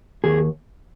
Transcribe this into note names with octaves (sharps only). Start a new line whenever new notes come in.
D#2 G#4